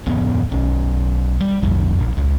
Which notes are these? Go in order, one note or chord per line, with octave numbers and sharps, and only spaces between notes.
D1 F2 B3
B1 C#4
G3
B1 F2
A#1
C#2